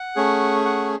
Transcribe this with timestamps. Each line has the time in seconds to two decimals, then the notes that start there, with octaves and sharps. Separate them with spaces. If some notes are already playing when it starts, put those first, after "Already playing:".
Already playing: F#5
0.16 A3 C#4 G#4
0.65 F#5